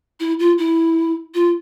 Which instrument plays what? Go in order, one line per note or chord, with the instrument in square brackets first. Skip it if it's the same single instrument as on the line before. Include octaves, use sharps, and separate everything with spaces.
[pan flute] E4
F4
E4
F4